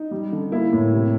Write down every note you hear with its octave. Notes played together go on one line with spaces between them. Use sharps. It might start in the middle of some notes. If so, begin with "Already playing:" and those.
Already playing: D#4
G3
D3
A#3 E4
A2
C3